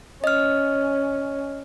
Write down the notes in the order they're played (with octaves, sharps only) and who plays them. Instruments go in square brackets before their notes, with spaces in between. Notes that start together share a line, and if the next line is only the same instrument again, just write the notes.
[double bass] C#4 [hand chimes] D#5 F6